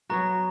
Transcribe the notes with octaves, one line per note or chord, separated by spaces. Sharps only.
F#3 B3 F#4 A#5